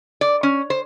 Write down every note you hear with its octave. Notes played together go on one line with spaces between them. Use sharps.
D5
C#4
C5